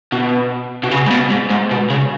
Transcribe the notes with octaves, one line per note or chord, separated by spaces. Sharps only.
B2
B2
C#3
G#2
B2
G#2
G#2
B2
C#3